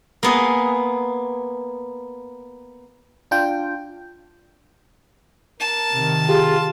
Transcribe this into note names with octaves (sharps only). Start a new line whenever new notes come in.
A#3 B3 G#4
D4 F4 G5
A#4 A5
C3 D#3
F4 G4 G#4